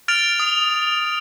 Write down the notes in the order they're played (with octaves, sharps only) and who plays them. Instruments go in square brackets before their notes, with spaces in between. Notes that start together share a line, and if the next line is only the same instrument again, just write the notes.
[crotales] F6 A6 D7 F7
D#6